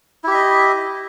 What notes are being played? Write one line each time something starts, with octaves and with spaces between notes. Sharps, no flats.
E4 G4 D#5 E5